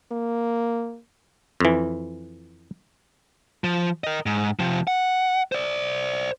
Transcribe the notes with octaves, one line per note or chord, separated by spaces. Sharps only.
A#3
F2 E3
F3
A#4 D#5
G#2
C3 F3
F#5
C5 D5